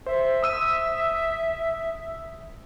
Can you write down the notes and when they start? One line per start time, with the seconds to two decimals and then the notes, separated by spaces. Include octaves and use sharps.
0.06 C5 E5
0.43 D#6 E6 D#7